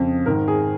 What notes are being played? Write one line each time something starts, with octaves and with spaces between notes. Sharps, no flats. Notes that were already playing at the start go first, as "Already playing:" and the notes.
Already playing: F2 C#3
G#2 D#3 A#4
G#4